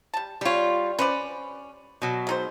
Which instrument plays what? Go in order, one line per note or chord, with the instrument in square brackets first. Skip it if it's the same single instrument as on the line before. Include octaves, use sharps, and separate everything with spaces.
[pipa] G3 A5
[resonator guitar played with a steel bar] G3 F4 [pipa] G4 C#5
[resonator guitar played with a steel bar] C#4 [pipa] B4 C5 D5
[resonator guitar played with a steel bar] B2 F#3
[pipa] G#3 D#4 C5